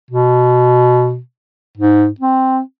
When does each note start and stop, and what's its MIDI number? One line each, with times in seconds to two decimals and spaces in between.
0.10 1.19 47
1.77 2.07 44
2.20 2.60 60